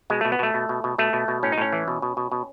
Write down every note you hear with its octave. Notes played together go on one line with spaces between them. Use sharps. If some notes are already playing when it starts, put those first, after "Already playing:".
B2 G#3
B2 A3
B3
B2 A3
B2
B2
B2
B2 A3
B2
B2
A2 C#4
D#4
A2 C#4
E3
B2
B2
B2
B2